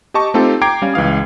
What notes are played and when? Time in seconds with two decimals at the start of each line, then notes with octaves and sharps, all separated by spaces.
0.14 G4 D#5 A5 C#6
0.34 A3 C4 D#4 F4 G4 A4
0.62 G5 A#5 D6 G#6 C7 D7
0.82 G3 C#4 F5
0.94 C#2 E3 F5 D#6